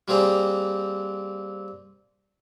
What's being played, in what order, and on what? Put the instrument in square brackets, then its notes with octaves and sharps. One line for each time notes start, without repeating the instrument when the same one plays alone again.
[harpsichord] G3 A#3 C4 G#4 A#5